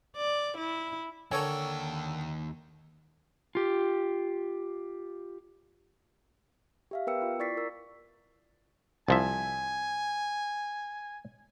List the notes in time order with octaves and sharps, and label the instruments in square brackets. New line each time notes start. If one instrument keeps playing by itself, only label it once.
[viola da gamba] D5
E4
[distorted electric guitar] D#2 G5 [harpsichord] D3 A4 A#4 [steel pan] C#5 G#5
[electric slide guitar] F4 G4
[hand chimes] G4 E5 F5
B3 A#4 B4 G5 E6 C#7
F4
E4 D5 C#6 A6 B6 C7
A#4 E6
[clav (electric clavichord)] C2 F3 E5 [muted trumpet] G#5